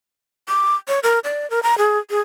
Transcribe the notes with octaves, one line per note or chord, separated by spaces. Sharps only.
D6
C#5
A#4
D5
A#4
A#5
G#4
G#4